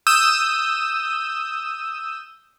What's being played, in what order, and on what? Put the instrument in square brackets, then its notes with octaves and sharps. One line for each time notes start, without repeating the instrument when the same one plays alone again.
[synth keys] D#6 E6 G6